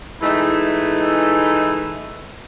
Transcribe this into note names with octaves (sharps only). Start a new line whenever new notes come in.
E3 G#3 A3 D#4 E4